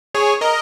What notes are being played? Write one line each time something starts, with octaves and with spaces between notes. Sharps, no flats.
G#4 C#5
A#4 D#5